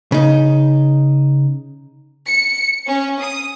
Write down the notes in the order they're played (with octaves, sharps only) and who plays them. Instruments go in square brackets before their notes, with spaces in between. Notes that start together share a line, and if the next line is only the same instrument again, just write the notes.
[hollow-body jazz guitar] C#3 D#4
[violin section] C#7
C#4
D#6